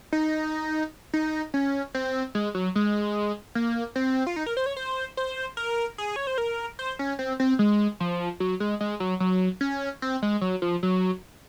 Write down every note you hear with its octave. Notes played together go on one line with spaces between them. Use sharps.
D#4
D#4
C#4
C4
G#3
F#3
G#3
A#3
C4
F4
D#4
A#4
C5
C#5
C5
C5
A#4
G#4
C#5
C5
A#4
C5
C#4
C4
C4
G#3
F3
F#3
G#3
G#3
F#3
F#3
C#4
C4
G#3
F#3
F3
F#3